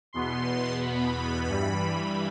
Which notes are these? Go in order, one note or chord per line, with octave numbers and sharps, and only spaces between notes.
E2 B2 B3 C6
B5
G2 E3 G3